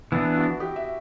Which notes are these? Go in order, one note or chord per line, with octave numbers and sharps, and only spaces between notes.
E3 B3 D4 E4
F#4
G4
E5